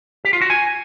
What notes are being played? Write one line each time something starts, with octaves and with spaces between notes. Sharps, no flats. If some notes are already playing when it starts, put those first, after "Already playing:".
G4
F4
F#4
G#5